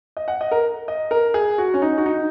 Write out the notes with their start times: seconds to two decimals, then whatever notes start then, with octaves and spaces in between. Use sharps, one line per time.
0.17 D#5
0.28 F#5
0.41 D#5
0.51 A#4
0.88 D#5
1.11 A#4
1.34 G#4
1.58 F#4
1.74 C#4
1.82 D#4
1.98 F#4
2.06 D#4